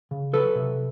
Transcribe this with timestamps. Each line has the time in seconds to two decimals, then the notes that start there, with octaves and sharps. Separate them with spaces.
0.11 C#3
0.33 F#3 A4 B4
0.55 C3